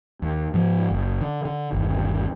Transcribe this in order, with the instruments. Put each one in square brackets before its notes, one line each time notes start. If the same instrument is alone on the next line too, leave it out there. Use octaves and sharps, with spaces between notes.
[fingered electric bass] D#2
G#2 F3
F#1
D3
D3
G1 D#2